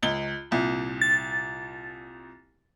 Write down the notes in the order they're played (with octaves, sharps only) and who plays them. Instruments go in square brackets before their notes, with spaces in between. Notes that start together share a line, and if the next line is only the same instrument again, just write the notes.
[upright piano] C#2 G7
C2 A#2
[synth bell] A6